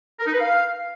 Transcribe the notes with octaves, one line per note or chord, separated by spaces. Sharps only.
A#4
D#4
B4
F5